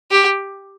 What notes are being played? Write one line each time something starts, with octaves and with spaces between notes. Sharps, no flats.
G4